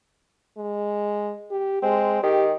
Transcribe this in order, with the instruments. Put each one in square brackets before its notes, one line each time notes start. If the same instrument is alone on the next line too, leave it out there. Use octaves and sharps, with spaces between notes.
[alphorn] G#3
G4
[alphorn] G#3 [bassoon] C4
[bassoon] D#3 [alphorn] G4